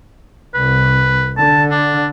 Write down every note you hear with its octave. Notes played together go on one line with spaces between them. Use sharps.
C2 B4
D3 A5
D4